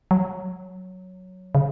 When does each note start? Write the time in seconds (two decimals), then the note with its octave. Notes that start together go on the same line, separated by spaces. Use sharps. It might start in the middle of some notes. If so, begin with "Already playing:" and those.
0.11 F#3
1.55 C#3